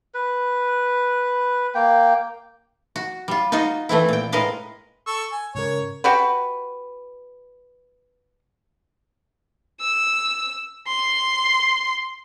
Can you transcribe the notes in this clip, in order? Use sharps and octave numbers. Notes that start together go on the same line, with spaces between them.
B4
A#3 G5
F#4
G3 F4
D#4 F4 F#4 D#5
E3 A3 C4 E4
A#2 G5
A2 G#3 A#4 B4 D#5 F5
A4 C#6 E6
G#5
G#2 C#3 A#4 C#5
F#4 G4 B4
E6
C6